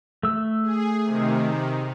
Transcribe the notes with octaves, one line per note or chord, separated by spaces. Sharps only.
A3 E6
G#4
C3 D#3